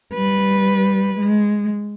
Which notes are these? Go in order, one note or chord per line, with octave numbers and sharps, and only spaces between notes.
G3 B4
G#3